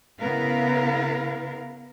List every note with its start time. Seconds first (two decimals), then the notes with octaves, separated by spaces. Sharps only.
0.20 C#3 B3 E4 A#4 B4 F5